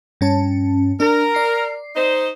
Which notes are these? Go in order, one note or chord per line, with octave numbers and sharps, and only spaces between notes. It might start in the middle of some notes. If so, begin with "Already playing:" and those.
G2 C#4 A5
D4 A#4
D5 C7
D#4 C5